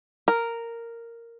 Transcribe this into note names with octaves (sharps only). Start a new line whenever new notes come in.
A#4